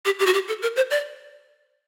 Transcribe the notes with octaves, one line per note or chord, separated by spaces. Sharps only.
G4
G4
F#4
G4
A4
A#4
C5
D5